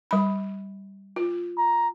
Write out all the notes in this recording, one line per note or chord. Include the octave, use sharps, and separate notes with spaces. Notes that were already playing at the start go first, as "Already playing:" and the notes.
G3 B5
F4
A#5